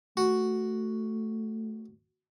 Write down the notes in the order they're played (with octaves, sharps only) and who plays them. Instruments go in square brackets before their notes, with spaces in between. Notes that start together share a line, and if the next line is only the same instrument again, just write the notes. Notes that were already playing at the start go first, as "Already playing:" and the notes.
[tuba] A3 [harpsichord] F#4